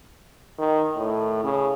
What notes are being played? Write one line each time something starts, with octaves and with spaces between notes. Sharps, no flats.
D#3
A2
C#3